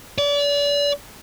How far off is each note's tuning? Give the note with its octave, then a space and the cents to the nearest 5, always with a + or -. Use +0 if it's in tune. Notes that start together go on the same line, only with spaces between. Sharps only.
D5 -35